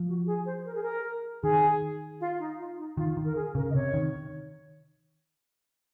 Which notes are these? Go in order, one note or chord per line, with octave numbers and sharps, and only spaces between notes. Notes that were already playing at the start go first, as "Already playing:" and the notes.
Already playing: F3
F#4
G#4
C5
A#4
G#4
A#4
D#3 G#4
F4
D#4
F4
D#4
D#3 F4
D#3
A#4
G#4
C#3 A#4
D#5
C3 C#5
D#3